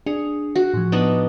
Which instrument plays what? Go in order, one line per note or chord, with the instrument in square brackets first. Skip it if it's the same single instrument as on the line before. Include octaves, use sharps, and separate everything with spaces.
[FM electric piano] D4 [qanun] G#4
[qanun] F#4
[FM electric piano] A2 F3
[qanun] B3 D4 D#4